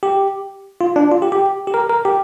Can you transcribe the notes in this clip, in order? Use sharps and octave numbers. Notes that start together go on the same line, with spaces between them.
G4
F4
D4
F4
G4
G4
G4
A#4
A#4
G4